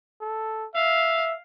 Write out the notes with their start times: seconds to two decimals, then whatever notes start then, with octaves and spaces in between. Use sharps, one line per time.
0.21 A4
0.75 E5 F5